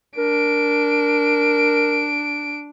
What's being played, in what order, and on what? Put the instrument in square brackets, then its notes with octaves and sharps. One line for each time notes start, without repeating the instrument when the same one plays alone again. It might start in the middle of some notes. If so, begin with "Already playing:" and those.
[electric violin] D4 D7 [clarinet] A#4